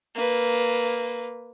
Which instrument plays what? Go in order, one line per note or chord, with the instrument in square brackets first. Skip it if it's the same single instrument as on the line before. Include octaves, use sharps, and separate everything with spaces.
[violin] A#3 B4